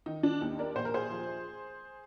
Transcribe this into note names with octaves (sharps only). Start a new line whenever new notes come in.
D#3 D#4
D4
D#2 D#4
A#4 D5
A#1 C5
A#4
G#4 C5
F3